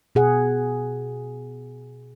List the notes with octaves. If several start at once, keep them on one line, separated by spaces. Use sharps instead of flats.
B2 G#4 F#5